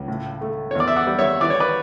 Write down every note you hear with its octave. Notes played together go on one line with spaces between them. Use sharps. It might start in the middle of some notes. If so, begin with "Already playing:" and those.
Already playing: C#2
A2
A3
C#5
E2
D5
E5
D5 F#5
G3
C#5 E5
E3 D5
C#5
B4 D5